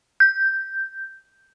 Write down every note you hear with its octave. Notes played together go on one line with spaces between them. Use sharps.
G6